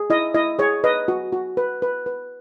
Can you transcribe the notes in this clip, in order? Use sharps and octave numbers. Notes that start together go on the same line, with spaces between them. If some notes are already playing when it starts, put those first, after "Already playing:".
Already playing: G#4
E4 D#5
E4 D#5
G#4 C#5
B4 D#5
F#4
F#4
B4
B4
B4